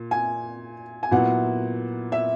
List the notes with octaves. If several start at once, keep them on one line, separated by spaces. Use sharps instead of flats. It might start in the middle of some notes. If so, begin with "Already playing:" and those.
Already playing: A#2
G#5
G#5
A#2 F#3 B3 E4 F#5
E5